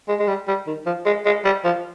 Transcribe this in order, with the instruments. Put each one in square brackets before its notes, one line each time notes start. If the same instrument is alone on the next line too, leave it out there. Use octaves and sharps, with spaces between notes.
[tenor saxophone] G#3
G#3
G3
G3
D#3
F3
G#3
G#3
G3
F3